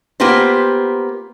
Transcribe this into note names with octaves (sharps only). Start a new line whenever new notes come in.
A#3 B3 F4 G4 B4 C5